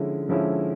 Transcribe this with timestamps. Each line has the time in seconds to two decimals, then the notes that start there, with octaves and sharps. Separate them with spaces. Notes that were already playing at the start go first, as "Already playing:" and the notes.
Already playing: D3 F3 G#3 C#4 E4
0.29 D3 F3 G#3 C#4 E4